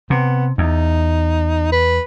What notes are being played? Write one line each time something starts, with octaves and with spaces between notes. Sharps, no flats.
C3 B3
E2 D#4
B4